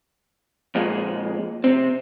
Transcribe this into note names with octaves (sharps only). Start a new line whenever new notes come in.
F2 A#2 G#3
C3 C4